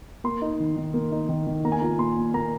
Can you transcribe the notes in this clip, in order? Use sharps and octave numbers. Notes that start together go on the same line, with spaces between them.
A#3 C6
D#4
D#3
D#3
A#3
D#4
D#3
D#3
A#3 A#5
G#5
F4 A#5
A#2 C6
A#2
A#3 A#5